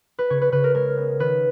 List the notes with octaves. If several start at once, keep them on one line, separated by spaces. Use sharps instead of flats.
B4
C#3 C#5
B4
C#3 B4
A#4
G#3 A#4
B3
D#3 B4